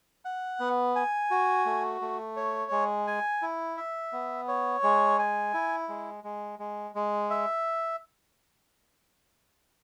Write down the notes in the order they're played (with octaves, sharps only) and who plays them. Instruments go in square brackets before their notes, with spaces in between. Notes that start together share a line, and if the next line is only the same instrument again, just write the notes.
[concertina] F#5
B3
G#5
F#4
A3
A3
C#5
G#3
G#5
E4
E5
B3
C#5
G#3
G#5
E4
G#3
G#3
G#3
G#3
E5